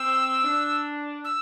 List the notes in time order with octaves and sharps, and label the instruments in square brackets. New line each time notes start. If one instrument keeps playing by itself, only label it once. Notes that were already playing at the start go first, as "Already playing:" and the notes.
Already playing: [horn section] C4 [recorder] E6
[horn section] D4
[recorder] E6